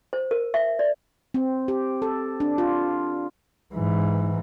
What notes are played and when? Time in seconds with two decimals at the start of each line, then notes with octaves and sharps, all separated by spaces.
0.13 C5
0.31 A#4
0.54 E5
0.79 D5
1.34 C4
1.68 G4
2.02 A4
2.40 D4
2.58 F4
3.74 G#2 E3